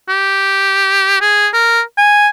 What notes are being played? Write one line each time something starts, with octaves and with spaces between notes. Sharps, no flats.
G4
G#4
A#4
G#5